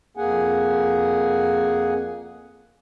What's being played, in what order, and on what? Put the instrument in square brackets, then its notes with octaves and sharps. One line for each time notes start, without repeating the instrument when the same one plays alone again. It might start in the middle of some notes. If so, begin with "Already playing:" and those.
[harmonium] F2 A#3 G#4 F#5 G#5